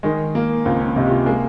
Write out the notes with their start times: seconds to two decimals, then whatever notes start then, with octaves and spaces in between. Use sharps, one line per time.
0.03 D#3 G#3
0.35 A#3
0.65 C#2 C4
0.80 C#4
0.96 C3 D#4
1.06 G4
1.11 F4
1.26 G#3 A#3